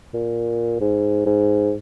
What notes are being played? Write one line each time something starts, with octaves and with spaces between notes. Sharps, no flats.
A#2
G#2
G#2